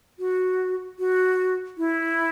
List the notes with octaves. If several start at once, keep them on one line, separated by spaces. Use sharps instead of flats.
F#4
F#4
E4